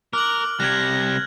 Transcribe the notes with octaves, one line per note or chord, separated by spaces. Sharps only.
A#4 D6 F6 F#6 F#7
C3 G3 F#6 G#6 A#6